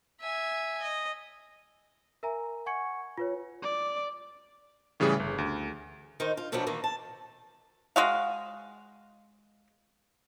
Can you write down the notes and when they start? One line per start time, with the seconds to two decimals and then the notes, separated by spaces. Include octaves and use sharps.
0.20 E5 G#5
0.82 D#5
2.23 A#4 E5 G#5 A#5
2.66 F#5 G#5 C#6 G#6 C#7
3.18 F4 B4 C#5
3.62 D5
5.00 A2 C#3 E3 G3 G#4
5.20 G1
5.38 D2
6.20 D#3 D#4 C5
6.37 F4
6.52 D2 B2 F3 F#3 B3 D4
6.67 D#3 E3 A#3
6.84 A5
7.96 G#3 F#4 F5